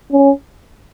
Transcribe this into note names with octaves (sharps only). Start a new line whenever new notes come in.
C#4